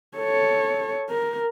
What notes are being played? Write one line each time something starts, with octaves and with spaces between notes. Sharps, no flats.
A4 C#5
A#4